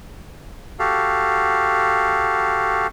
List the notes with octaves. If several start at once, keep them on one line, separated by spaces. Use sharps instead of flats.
F#4 G4 A4 F5